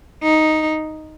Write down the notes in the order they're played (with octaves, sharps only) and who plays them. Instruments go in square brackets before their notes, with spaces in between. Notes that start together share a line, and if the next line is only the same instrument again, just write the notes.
[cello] D#4